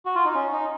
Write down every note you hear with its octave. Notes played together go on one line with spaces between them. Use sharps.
F#4
F4
D#4
C#4
D#4